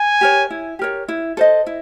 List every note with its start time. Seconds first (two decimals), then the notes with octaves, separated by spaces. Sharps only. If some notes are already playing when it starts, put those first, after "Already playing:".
Already playing: G#5
0.21 G4 A#4 C#5
0.50 E4
0.79 G4 A#4 C#5
1.08 E4
1.37 A4 C5 D#5
1.66 E4